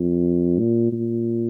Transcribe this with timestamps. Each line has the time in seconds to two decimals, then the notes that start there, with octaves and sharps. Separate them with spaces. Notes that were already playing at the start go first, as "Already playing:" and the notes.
Already playing: F2
0.59 A#2
0.92 A#2